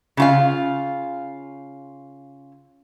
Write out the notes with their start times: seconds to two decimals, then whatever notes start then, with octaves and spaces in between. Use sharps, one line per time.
0.17 C#3 F4 F5